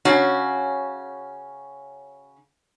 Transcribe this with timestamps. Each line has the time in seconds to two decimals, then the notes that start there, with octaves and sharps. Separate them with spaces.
0.05 C#3 C#4 F#4